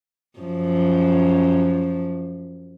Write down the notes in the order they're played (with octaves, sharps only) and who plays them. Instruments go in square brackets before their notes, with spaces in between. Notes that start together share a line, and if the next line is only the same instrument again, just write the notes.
[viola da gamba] F#2 F3